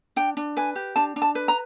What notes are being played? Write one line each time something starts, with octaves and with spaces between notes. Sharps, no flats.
D4 G5
D4
B4 G#5
G4
D4 A5
D4
A5
B4
A#5